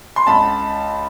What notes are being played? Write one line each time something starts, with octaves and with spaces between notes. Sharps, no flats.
C6
C#2 A5 B5